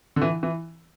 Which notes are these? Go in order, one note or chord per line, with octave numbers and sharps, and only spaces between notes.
D3
E3
E3